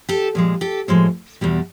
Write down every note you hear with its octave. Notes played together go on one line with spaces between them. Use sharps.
G4 A4
A#2 F3 G#3
G4 A4
A2 F3 G#3
E2 B2 G3